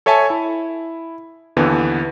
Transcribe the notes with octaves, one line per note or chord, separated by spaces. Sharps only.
A4 C#5 E5 G#5 A5
E4
D#2 D3 E3 B3